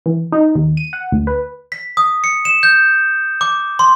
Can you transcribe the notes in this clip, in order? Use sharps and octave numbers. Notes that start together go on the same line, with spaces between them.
E3
D#4
D#2
D#7
F#5
D2
B4
B6
D#6
C#7
E7
G6
D6
C6